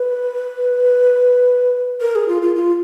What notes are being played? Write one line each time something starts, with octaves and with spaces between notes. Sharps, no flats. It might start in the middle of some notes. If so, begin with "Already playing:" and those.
Already playing: B4
A#4
G#4
F4
F4
F4